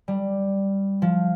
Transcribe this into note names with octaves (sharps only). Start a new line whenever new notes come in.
G3
F3